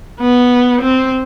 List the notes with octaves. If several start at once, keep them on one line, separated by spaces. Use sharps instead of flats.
B3
C4